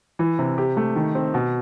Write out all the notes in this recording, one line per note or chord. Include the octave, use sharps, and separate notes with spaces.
E3
C3
G4
A3
D#3
C4
B2